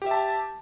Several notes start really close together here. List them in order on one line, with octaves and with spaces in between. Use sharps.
G4 E5 A5